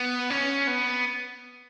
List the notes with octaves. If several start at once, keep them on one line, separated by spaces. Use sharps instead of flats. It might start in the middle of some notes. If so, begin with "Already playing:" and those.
Already playing: B3
C#4
B3